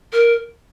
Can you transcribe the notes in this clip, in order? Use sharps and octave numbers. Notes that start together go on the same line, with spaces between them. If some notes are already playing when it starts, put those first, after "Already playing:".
A#4